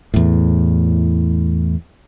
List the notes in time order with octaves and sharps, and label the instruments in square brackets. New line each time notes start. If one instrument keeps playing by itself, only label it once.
[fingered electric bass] E2 A2